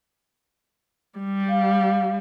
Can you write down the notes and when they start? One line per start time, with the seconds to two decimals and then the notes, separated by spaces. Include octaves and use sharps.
1.19 G3
1.49 F5